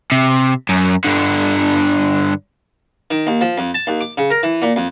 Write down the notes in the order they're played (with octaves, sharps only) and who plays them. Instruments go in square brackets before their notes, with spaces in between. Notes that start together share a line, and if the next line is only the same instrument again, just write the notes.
[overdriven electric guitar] C3
F#2
G2 D3
[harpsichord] D#3
D#2
F3
F2
A5
D#2
D6
C#3
A#4
E3
A#2
F2